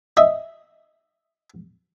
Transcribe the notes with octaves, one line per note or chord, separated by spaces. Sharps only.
D#5 E5